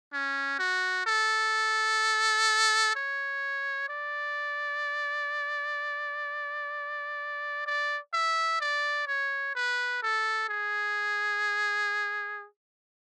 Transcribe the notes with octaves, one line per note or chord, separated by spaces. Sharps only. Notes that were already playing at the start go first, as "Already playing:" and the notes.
C#4
F#4
A4
C#5
D5
D5
E5
D5
C#5
B4
A4
G#4